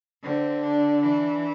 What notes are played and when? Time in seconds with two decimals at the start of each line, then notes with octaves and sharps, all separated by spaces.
0.23 D3 C4
0.63 D4
1.02 E3 D4